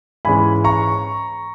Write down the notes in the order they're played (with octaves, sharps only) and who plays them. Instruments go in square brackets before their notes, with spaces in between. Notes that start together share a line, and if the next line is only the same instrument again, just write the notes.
[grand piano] G#2 E3 G#3 C#4 G#5 B5
A#5 C#6